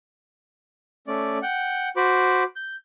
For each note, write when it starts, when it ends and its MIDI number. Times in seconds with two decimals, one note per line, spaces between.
1.07 1.38 57
1.07 1.38 61
1.07 1.38 74
1.42 1.89 78
1.42 1.89 79
1.97 2.43 66
1.97 2.43 72
1.97 2.43 83
1.97 2.43 86
2.56 2.76 91